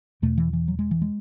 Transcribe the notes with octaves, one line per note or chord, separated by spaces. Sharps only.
E2 B2 A3
E3
E3
F#3
G#3
E3
G#3